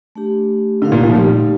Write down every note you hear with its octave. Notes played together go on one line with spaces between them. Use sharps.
A3 D4 G4
D3 A3 D#4 G4 A#4 F5
A#2
A#2
F3
G3